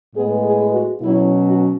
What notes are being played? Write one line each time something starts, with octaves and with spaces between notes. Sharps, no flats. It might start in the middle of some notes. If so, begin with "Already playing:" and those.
A2 G#3 B3 G#4
G#4
F#4
B2 F#3 C#4 E4
F#4